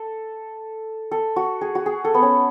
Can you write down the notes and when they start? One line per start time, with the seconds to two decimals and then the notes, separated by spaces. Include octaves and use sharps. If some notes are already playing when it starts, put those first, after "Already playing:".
Already playing: A4
1.11 A4
1.36 F#4
1.61 G#4
1.75 F#4
1.86 G#4
2.05 A4
2.14 B3
2.22 C#4